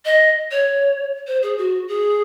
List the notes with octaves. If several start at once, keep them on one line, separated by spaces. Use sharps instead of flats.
D#5
C#5
C5
G#4
F#4
G#4